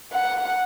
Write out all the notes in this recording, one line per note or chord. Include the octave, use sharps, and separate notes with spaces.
F#5